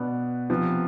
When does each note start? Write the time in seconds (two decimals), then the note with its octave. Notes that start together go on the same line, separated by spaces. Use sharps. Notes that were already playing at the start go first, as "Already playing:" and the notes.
Already playing: B2 B3 D4
0.50 C3 F3 B3